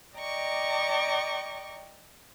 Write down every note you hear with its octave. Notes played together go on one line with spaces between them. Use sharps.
D5 D#5 G5 A#5 C#6 D6